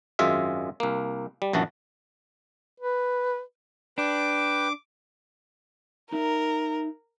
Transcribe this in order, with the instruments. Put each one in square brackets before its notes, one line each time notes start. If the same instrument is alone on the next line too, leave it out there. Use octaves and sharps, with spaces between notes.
[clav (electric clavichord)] G#1 F#2 G#3 F4 G#4 E5
C2 A#3
G3
A#1 F#2 E3 F#4 A5
[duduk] B4
[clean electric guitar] D4 [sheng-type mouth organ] B4 G5 [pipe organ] D6
[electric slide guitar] D#4 E5 [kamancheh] A#4